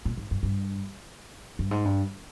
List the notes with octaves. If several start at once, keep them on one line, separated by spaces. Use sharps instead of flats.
A#2
G#2
G2
G2
G2
G#2
G2